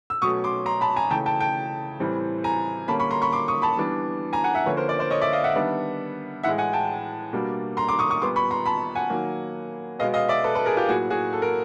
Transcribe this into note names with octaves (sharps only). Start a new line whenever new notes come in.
E6
B2 F#3 A3 C#4 C#6 D#6
C6 D6
A#5 C6
A5 B5
G#5 A#5
C#3 E3 A3 G5 A5
G5 A5
G5 A5
A2 E3 G3 C4
G#5 A#5
D3 G3 A#3 C#4 A5 B5
B5 C#6
A#5 C6
B5 C#6
C6 D6
C#6 D#6
A5 B5
E3 G3 B3 D4
G#5 A#5
F#5 G#5
E5 F#5
D3 F3 A#3 C#4 B4 C#5
A#4 C5
C5 D5
C5 D5
C#5 D#5
D5 E5
D#5 F5
E5 F#5
D#3 G3 B3 D4
A2 E3 G#3 E5 F#5
F#5 G#5
G5 A5
B2 G3 A#3 D4
A#5 C6
C6 D6
C#6 D#6
C#6 D#6
A#2 G3 B3 C6 D6
B5 C#6
A#5 C6
A5 B5
F#5 G#5
D#3 F#3 A#3
B2 G#3 B3 D#5 F5
D#5 F5
D5 E5
A4 B4
A4 B4
G#4 A#4
F4 G4
A2 F#3 A#3 F#4 G#4
F#4 G#4
A4
A#4